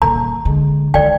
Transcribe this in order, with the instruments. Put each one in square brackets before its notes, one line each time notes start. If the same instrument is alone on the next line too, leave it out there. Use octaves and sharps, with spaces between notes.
[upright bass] D#1 D#3 [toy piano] A#5
[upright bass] D3 G#3
[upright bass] D#3 G#3 [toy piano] D5 G5